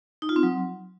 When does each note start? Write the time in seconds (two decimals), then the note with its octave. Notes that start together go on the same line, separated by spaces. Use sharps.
0.22 D#4
0.29 F4
0.36 C4
0.43 F#3